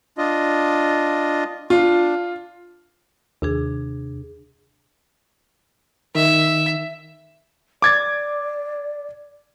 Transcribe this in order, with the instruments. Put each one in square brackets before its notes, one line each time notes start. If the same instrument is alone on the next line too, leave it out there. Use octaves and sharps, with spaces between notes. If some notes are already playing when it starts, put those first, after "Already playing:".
[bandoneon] D4 F4 D#5
[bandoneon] D4 [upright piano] F4
[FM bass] D#2 [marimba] C3 D4 G#4
[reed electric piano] D#3 [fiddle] E5
[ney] D5 [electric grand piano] D6 G#6 A6